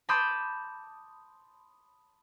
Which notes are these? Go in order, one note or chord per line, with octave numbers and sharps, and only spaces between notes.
A5 B5 C6 D6 D#6 G6